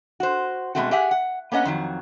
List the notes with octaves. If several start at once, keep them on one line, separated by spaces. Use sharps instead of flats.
F#4 C5
B2 D#3 G#3 A3 C4 F#4
G4 G#4 E5 F#5 G#5
F#5
A#3 B3 C#4 D#5 F#5
F2 D#3 F#3